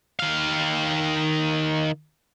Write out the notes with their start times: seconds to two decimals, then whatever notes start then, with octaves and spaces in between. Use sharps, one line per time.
0.20 D#3 F5